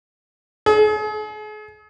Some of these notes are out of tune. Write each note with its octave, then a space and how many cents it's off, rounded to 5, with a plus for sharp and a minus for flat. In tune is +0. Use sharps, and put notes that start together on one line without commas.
G#4 +40